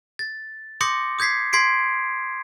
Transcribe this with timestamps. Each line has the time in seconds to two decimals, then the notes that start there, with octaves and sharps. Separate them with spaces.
0.19 A6
0.81 C6 D6 D#6 G6 A#6 C#7
1.19 D#6 G6 G#6 B6 C7
1.53 C6 G#6 B6 C7 D7